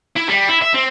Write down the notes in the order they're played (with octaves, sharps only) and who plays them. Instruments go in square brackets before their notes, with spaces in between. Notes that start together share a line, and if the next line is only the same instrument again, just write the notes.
[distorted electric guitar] E4
G3
E4
E5
C4